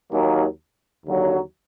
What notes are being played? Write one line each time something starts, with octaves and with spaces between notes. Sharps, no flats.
D#2 D#3 F#3 A#3
D#2 D3 F#3